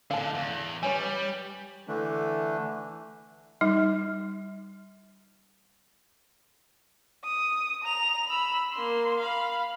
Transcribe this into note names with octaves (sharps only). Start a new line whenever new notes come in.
A2 D3 F5 A5
E2
G3 B4 C#5 G#5
D3 E3 A3 D4
G3 D#4
D#6
A#5 F7
B5 E6
A#3 C6
F5 B5